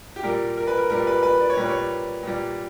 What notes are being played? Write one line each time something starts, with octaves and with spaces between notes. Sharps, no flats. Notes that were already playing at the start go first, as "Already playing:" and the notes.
G4
A#2 G3 A#4
A#4
B4
A#4
A#2 G3 A#4
B4
B4
D5
C#5
A#2 G3 B4
C#5
A#2 G3